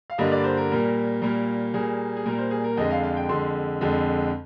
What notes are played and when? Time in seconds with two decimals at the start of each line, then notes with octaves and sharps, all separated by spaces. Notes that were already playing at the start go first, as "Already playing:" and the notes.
0.10 F5
0.18 G2 D3 G3 A#3 D#5
0.32 D5
0.44 C5
0.57 A#4
0.71 A#2 G3 A#3
1.22 A#2 G3 A#3 A#4
1.74 A#2 G3 A#3 G#4
2.16 G#4
2.26 A#2 G3 A#3 A#4
2.38 C5
2.51 G#4
2.64 A#4
2.77 F2 D3 G#3 D#5
2.91 F5
3.03 F5
3.17 G5
3.29 F2 D3 G#3 C6
3.81 F2 D3 G#3